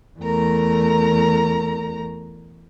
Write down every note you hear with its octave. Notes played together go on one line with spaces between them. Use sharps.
E2 A3 A#4 A#5